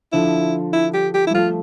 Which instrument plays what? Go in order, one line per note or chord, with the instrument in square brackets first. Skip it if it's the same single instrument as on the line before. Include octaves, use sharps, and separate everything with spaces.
[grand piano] D3 F3 [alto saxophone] E4
[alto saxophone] E4
G4
G4
E4
[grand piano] G3
[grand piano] F3 A3 [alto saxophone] F4